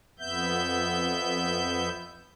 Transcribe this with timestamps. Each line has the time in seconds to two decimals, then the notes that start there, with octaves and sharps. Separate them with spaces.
0.19 F2 B3 E5 G6